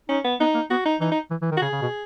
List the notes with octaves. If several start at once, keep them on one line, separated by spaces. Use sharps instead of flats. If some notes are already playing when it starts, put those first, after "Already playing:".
C#4 D#4
B3
B3 D#4
A#3
B3 F#4
D#4
E3 D#4
D#4
E3
E3
D#3
F#4
C#3 G#4
C#3
B2